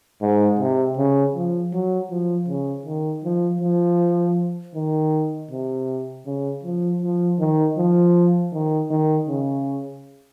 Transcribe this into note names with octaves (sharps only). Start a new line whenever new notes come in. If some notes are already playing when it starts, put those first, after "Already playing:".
G#2
C3
C#3
F3
F#3
F3
C#3
D#3
F3
F3
D#3
C3
C#3
F3
F3
D#3
F3
D#3
D#3
C#3